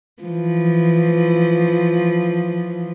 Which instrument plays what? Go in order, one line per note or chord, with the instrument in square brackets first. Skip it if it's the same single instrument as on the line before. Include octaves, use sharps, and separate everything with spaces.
[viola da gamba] E3 F3